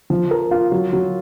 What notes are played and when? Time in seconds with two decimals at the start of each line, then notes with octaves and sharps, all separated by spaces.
0.10 F3
0.31 A#4
0.51 F4
0.72 F#3
0.93 F#3